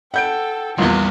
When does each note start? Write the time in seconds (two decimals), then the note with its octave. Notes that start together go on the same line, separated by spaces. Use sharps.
0.14 A4 F#5 G5 G6 D7
0.78 A#1 E2 G3 B3 C6